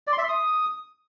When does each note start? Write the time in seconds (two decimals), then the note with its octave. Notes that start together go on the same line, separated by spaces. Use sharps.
0.07 D5
0.13 C6
0.18 E5
0.23 C6
0.29 D#6